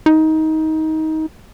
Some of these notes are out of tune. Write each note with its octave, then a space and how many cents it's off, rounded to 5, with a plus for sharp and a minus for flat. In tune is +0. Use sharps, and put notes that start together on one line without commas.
D#4 +20